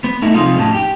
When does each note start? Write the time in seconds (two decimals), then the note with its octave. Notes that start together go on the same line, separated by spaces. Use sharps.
0.04 B3
0.22 A3 D#4 E4
0.34 C3 F3 G#3 D#4 F4
0.57 F2 A2 C#4 D#4 G4 A5
0.72 G4 G5